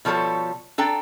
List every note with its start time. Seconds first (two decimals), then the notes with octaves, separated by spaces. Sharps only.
0.05 B2 F3 G3 A4 C#5
0.78 D4 A4 G5 A#5